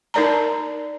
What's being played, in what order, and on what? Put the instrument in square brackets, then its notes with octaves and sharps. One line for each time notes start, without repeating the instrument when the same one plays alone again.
[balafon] D#4 A#4 D5 A5 A#5